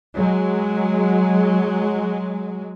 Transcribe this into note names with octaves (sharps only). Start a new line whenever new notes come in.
F#3 G#3